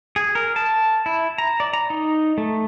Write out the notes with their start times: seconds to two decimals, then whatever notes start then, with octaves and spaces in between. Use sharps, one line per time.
0.16 G#4
0.35 A#4
0.56 A5
1.06 E4
1.38 A#5
1.60 D5
1.73 A#5
1.90 D#4
2.38 A3